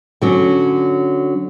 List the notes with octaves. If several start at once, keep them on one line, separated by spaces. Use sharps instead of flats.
D3 F#3 C#4